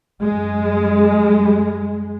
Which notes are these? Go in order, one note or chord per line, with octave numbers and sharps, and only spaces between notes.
F#2 G#3